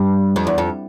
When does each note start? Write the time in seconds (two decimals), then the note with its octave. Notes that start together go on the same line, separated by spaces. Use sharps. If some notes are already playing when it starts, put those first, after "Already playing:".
Already playing: G2
0.36 F2
0.47 E2
0.58 F2